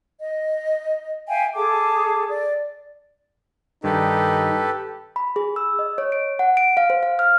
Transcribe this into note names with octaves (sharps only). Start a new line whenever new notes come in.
D#5
E5 F5 G5 G#5
G#4 A4 A5 D6
D5
G2 D#3 D#4 G4 A4 B4
B5
G#4
E6
D#5
C#5
D7
F#5
D7
F5
C5
F5
F6